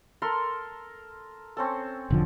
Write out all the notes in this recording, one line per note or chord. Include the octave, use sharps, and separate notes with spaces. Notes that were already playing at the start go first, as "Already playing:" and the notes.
A4 A#4 C6
C4 C#4 A4
E1 D3 F3